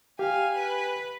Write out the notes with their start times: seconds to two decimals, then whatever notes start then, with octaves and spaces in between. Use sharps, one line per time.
0.19 G4 F5 G#5
0.55 B4